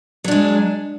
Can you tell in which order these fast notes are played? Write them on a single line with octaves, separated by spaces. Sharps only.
F#3 D4 G#3